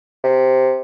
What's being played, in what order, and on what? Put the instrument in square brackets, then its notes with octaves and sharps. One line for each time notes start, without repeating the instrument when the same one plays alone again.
[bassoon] C3